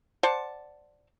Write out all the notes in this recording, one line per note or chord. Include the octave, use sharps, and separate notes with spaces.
C5 D5 F#5 A5